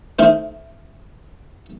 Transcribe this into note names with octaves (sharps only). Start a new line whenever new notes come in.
D#3 A3 E4 C5